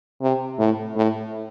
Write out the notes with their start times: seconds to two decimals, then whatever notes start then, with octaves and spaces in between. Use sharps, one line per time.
0.21 C3
0.59 A2
0.96 A2